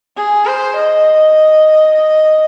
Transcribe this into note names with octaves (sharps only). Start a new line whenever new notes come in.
G#4
C5
D#5
D#5